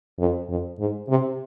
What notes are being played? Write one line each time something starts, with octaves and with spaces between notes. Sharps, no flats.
F2
F2
G#2
C3